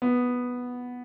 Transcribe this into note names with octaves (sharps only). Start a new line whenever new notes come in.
B3